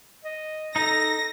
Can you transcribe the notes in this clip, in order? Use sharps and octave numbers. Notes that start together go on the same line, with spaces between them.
D#5
D#4 A4 A#6